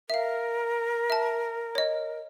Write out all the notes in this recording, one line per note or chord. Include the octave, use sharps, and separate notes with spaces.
A#4 E5 F5
E5 A5
C#5 D#5